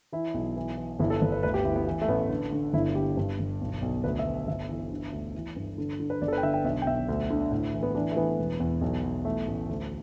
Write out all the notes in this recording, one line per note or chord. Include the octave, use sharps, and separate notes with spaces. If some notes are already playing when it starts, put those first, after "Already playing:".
E3 E4
B1
E3
E3
G1 E4
A4
G1 B4
B4
D2 B4
G4
D2 E4
B3
E3
A3
A1 B3
D3
D3
G1 E4
D3 G4
G2
G1
B1
B1
D2 B4
E5
D2
G1 E5
E3
D3
D2
E3
G2
D3
D3
B4
G1 D5
A4
B4
G5
D3 E5
G5
B1 E5
G5
B1 E5
D2
D3
A2
E3
B3
E3 D4
A3
E3 B3
E1
E2
B1
B1
E3 A3
A1
D2